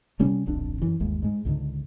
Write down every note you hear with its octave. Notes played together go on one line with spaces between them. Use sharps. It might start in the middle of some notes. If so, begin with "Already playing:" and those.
C3 G3 C#4
D#1 B1 F2 D4
F#2 E3
G1 D#2 G#3
G#2 G#3
C#2 G#2 D3